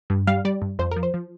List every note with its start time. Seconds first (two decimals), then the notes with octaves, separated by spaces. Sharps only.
0.10 G2
0.27 G3 F5
0.45 G3 D5
0.62 G2
0.79 F2 C5
0.91 A#4
0.96 F3
1.03 C5
1.14 F3